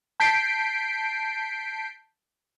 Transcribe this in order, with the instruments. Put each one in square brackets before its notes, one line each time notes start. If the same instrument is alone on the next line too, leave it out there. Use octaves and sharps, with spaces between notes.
[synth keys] A5 G6 B6 C7 D7